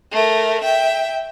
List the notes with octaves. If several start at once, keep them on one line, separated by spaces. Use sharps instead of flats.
A3 A#4
E5 G5